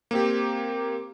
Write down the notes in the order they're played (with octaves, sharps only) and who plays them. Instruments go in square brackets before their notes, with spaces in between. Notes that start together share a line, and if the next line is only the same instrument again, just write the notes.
[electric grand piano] A#3 C4 G4